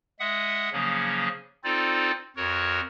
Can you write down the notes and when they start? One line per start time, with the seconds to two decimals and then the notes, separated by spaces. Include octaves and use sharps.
0.20 G#3 E5 F#5 D#6
0.73 C#3 F3 F#3 A#3 C#4 G#4
1.64 C4 D#4 F4 A4 C5 D5
2.37 F2 F#4 A#4 C#5